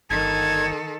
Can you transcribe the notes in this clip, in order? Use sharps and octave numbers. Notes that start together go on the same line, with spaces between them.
G1 D#3 A4 G#6